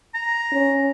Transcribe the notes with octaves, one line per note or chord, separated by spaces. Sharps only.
A#5
C#4